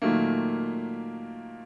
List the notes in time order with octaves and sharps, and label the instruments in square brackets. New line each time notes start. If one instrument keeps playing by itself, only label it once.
[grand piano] A#2 D#3 F#3 A3 A#3